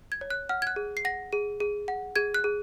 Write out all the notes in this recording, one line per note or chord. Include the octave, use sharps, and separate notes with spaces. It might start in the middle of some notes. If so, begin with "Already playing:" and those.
G#6
C#5
F#6
F#5 F6
G#6
F#6
G#4
C7
F#5 A#6
G#4
G#4
F#5
G#4 G#6
F#6
G#4